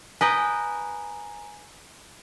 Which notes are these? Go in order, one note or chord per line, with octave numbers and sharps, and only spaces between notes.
B4 D#5 G5 G#5 A#5